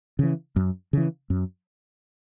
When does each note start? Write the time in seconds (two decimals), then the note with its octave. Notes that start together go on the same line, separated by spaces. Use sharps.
0.19 C#3 E3
0.56 F#2
0.93 C#3 E3
1.30 F#2